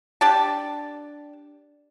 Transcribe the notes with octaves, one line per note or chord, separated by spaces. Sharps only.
D4 G4 A5